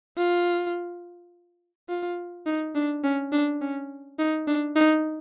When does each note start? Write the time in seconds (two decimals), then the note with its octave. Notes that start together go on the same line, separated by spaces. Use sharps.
0.17 F4
1.89 F4
2.46 D#4
2.75 D4
3.04 C#4
3.32 D4
3.61 C#4
4.19 D#4
4.47 D4
4.76 D#4